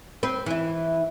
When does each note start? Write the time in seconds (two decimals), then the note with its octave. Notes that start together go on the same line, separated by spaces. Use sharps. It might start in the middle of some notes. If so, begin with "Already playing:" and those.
0.23 C4 B4
0.46 E3 E4